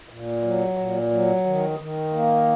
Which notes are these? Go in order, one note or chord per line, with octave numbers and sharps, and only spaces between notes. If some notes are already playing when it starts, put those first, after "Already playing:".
A#2
F#3
A#2
F#3
D#3
D#3
A#3